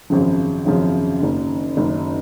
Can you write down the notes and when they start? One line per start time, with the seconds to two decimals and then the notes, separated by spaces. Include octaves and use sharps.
0.10 G#1 F#2 C#3 F3
0.66 G#1 F#2 C#3 F3
1.21 F#1 F#2 D#3
1.77 F#1 F#2 D#3